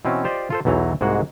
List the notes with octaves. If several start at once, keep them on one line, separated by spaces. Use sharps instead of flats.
B2 E3 C4 C#4
F4 G4 C5 D5 D#5
F4 A4 C5
B1 E2 E3 F#3 D#4 A#5
C2 G#2 G#3 A#3 F#4 F#5